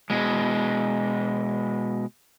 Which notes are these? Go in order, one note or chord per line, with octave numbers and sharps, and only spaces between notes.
B2 G#3